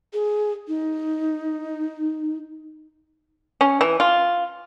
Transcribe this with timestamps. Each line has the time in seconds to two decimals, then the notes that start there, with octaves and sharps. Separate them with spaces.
0.13 G#4
0.68 D#4
3.61 C#4
3.81 E3
4.00 F4